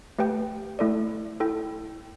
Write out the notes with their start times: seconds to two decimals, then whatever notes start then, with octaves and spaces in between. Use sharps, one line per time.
0.19 A3 G4 B4 G5
0.79 A3 E4 A4 D5
1.40 E4 A4 G5